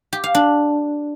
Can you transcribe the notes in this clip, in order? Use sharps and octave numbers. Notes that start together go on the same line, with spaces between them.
G4
F5
D4